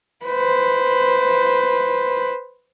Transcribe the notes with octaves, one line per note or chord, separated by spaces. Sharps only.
B4 C5